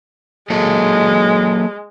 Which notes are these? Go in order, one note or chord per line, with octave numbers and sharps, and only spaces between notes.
F#3 G#3 A#3 A4